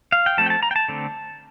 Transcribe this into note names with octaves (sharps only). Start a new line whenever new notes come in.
F5
G5
F3 A3 C4 A5
G5
A5
A#5
G5
A5
D3 A3 C4